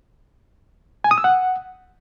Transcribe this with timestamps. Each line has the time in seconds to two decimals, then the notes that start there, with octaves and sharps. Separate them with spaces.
1.04 G#5
1.11 D#6
1.18 E6
1.24 F#5